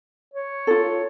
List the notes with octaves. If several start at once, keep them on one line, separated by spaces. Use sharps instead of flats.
C#5
F4 A4